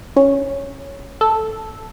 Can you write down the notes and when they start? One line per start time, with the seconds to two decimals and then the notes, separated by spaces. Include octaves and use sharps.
0.16 C#4
1.21 A4